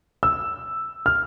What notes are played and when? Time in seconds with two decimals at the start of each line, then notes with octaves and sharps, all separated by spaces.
0.23 E6
1.06 F6